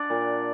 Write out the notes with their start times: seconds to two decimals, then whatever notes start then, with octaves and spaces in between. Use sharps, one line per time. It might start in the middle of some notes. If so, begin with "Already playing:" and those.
Already playing: D4 D5 F#5
0.10 A#2